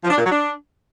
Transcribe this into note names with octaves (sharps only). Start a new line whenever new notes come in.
F3
D4
A#2
F#3
D4